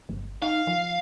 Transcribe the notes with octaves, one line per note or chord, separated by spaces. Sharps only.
G1
D#4 F5
F3